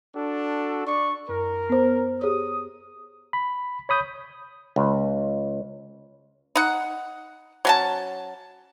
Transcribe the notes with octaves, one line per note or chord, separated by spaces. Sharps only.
D4 F#4 A4
D4 D5 C#6
F#2 A#4
B3 C5
G4 G#4 C#5 D#6
B5
C#5 B5 D#6 G6
C#2
D#4 F#5
F#3 C#4 A5